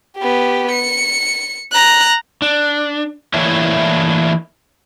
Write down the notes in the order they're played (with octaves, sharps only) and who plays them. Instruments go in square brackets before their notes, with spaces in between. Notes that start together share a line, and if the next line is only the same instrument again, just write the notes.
[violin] B3 G4
C#7
A#5 F#6
[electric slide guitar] D4
E3 A3 A#3 D4 E4 C#5